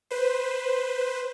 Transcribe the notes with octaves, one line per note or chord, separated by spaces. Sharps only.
B4 C5